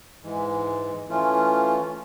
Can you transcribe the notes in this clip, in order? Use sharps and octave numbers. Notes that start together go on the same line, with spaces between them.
G#2 E3 G#3
E3 A3 C#4 F4